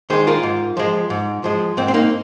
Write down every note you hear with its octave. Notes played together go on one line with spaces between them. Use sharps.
D#3 G#3 G#4 C5
F4 A#4
G#2
F3 G#3
G#2
F3 G#3
G#2 C4
C4
A#3 D#4